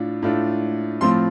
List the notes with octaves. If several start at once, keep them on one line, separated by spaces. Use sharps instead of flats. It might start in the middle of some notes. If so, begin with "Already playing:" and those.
Already playing: A2 D4 F4
A2 A3 D4 F4
A2 F3 C4 F4 C6